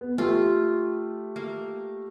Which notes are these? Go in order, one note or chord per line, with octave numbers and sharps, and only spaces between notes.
B3
A3 F4 G4
A#3